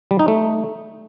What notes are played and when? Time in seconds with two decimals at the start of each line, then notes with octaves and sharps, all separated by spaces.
0.11 G3
0.19 D#4
0.28 A3